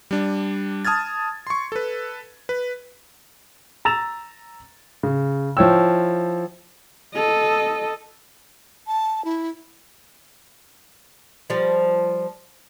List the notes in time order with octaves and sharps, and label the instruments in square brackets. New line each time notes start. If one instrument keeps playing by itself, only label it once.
[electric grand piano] G3 D4
A5 D#6 F6 G#6 A6
C6 C#6
A4 B4
B4
[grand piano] A#5 E6 A6 E7 F7
C#3
F3 E4 C#5 G5 E6
[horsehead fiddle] A4 D#5
[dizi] A5
E4
[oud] F3 G3